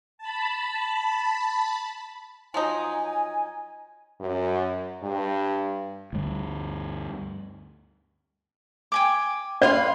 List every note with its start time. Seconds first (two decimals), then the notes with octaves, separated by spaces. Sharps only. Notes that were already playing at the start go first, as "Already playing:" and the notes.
0.18 A5 B5
2.54 F3 F#3 D#4 G#5
4.20 F#2
5.03 G2
6.13 D2 G2
8.92 G5 G#5 D6
9.62 B4 D5 F5 C6